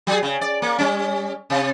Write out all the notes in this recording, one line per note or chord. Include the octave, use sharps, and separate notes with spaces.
F#3 G#4
C#3
D5
A#3
G3 C#4
C3